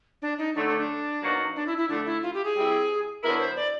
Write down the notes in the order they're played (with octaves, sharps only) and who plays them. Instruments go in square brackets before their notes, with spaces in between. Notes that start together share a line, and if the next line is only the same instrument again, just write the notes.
[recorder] D4
D#4
[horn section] D3 F#3 A3 [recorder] D4
[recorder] D4
D4
[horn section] B2 F#3 A#3 D#4 F#4
[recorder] D4
E4
E4
[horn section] D3 F3 A3 [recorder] D4
[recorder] E4
F4
G4
G#4
[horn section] G3 C4 E4
[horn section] D3 F#3 B3 E4 [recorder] A#4
[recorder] C5
D5